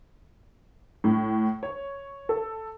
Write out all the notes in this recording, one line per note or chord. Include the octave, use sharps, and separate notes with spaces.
A2
C#5
A4